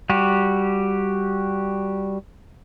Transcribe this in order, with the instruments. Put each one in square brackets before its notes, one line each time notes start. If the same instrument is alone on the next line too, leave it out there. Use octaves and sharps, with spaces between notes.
[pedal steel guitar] G3 F#4 G4